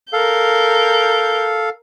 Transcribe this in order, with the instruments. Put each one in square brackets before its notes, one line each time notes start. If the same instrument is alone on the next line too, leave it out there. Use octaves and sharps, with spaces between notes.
[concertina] A4 F5 [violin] A#4 G6